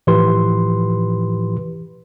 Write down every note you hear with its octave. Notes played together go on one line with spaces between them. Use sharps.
A2 E3 F3 G4 B4 C6